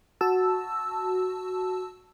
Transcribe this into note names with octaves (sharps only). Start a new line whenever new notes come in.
F#4 A5 E6